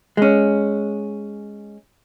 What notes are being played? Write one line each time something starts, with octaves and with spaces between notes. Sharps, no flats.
G#3 C#4